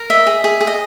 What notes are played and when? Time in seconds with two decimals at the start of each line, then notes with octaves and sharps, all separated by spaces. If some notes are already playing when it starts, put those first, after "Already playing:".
Already playing: A#4
0.10 D#5 E5
0.27 G#4
0.44 G#4
0.61 G#4
0.67 D#5